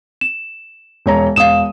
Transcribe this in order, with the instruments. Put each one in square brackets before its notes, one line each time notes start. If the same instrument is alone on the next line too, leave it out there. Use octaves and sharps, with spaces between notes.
[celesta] E7
[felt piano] E1 C#5 A#5
[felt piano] E1 D#6 [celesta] F5 E7